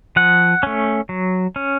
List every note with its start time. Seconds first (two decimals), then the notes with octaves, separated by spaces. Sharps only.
0.16 F3 F#5
0.63 A3 C#4
1.09 F#3
1.56 C#4